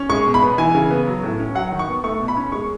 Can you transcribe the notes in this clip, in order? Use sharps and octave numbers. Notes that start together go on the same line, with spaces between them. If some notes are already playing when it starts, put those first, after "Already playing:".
Already playing: C#4
G#3 C#6
B2
B5
B3
E3 G#5
C#3
B3
F#3
A2
C#4
F#3 F#5
D#3
C#6
B3
A3 C#6
B2
B5
C#4
G#3 C#6